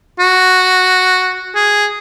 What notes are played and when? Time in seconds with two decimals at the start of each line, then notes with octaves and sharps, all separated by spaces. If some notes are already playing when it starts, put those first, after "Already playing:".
0.19 F#4
1.55 G#4